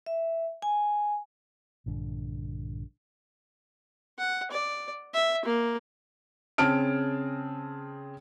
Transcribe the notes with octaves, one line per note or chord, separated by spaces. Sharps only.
E5
G#5
A#1 G2 D3
F#5
D5
E5
A#3
C#3 C4 G#4 A5 F6 D7